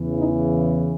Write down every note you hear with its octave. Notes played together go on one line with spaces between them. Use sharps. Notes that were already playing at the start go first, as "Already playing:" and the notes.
Already playing: E2 C#3 E3
D#4